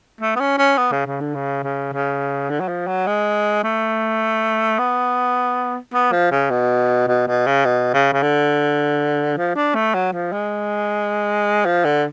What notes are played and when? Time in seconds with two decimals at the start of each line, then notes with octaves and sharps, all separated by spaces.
0.21 A3
0.36 B3
0.40 C#4
0.58 C#4
0.78 B3
0.92 C#3
1.06 C#3
1.20 D3
1.34 C#3
1.64 C#3
1.93 C#3
2.50 D3
2.60 F#3
2.68 F3
2.87 F#3
3.07 G#3
3.64 A3
4.79 B3
5.93 B3
6.12 F3
6.31 C#3
6.50 B2
7.08 B2
7.27 B2
7.46 C#3
7.65 B2
7.94 C#3
8.12 C#3
8.22 D3
9.37 F3
9.56 D4
9.75 A3
9.94 F#3
10.13 F3
10.32 G#3
11.65 F3
11.85 D3